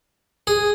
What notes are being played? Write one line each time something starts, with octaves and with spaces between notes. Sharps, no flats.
G#4